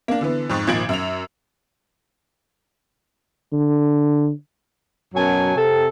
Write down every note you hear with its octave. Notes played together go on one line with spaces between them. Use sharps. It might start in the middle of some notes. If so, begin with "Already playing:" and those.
A#3 D4
D3 E3 B3
F2 G#2 C#6 A6
G#1 A#2 F3 G#6 D7 F#7
F#2 F7
D3
F#2 B2 F#3 G#5 A5
C3 A4